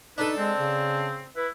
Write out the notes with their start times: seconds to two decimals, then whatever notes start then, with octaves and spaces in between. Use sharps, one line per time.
0.18 D4 D#4 A4 B4
0.37 G#3 C4
0.58 C#3
1.36 E4 B4